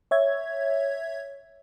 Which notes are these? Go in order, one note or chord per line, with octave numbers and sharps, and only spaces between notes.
C#5 E5 G#6